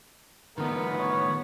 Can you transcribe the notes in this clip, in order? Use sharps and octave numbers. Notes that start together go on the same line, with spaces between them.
D#3 F3 A3 B3 A#4
C#5